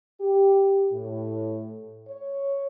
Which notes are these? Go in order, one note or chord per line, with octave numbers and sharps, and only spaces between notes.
G4
A2
C#5